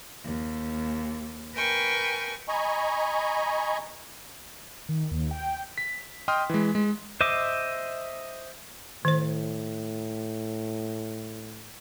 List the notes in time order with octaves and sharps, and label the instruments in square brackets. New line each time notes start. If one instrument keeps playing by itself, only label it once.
[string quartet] D#2
A#4 B4 G5 G#5 C#6
[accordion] D#5 G#5 A#5 B5 C#6
[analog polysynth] D#3
D#2
G5
[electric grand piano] B6
D#5 G5 C6 D#6 F6
E3 G#3
G#3
[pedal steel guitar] C5 D#5 E5 D6
[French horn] A2 [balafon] D#3 C5